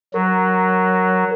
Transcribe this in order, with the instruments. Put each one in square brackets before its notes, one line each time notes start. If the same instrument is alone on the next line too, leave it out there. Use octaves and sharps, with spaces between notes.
[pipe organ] F#3 [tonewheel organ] A#4